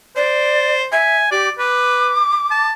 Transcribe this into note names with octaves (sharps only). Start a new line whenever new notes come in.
C5 D5
E5 G#5
G4 D5
B4 D6
A5